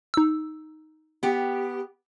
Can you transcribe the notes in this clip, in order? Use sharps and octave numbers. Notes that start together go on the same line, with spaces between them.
D#4 E6
B3 G4